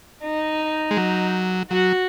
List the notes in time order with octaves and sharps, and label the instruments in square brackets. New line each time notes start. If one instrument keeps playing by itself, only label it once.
[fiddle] D#4
[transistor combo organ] G#3
F#3
[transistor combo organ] F#3 [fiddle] F#4